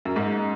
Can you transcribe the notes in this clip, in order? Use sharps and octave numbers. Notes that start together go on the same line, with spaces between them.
F#2
G#2